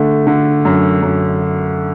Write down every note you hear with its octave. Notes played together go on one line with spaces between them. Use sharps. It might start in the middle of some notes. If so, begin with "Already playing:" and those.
Already playing: D3 A3
D3
F#2
F#2